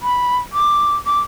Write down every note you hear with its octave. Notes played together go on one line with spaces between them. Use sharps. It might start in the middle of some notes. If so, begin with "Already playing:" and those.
B5
D6
D6